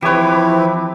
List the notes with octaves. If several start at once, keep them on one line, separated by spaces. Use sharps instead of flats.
E3 F3 C4 E4 G4 B4 C#5